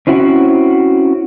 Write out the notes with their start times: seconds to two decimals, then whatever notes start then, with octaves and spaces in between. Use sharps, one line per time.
0.07 C4 C#4 E4 F#4